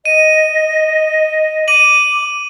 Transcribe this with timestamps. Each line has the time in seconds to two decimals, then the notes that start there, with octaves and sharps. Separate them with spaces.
0.05 D#5 D#7
1.68 D6 D#7 F#7